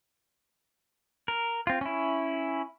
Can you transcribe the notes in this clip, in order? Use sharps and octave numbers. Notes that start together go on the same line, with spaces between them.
A#4
C4 F4
C#4 E4